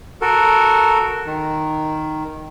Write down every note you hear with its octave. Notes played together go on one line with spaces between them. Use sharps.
F#4 A4 A#4
D#3